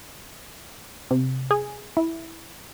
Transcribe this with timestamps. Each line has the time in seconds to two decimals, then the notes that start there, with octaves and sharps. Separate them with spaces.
1.11 C3
1.51 G#4
1.97 E4